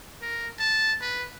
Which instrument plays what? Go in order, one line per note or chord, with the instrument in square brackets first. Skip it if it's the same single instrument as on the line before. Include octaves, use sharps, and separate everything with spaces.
[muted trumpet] A#4
A5
B4